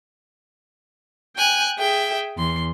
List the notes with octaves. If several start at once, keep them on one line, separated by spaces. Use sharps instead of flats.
G5 G#5 F#6
G#4 E5 G5
E2 C6